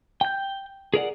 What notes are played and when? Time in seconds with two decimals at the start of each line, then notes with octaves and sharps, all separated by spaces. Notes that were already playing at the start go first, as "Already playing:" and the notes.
0.21 G5 G6
0.94 G#4 A#4 D5 F#5